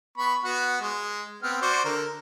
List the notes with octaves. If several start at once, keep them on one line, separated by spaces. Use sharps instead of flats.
B3 B5 C#6
B3 F#4 F#5
G#3
B3 C4 F6
F#4 C5 D5
D3 A#4